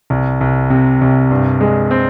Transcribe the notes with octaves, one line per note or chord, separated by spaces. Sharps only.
C2
C2
C3
C2
G2
G#3
C4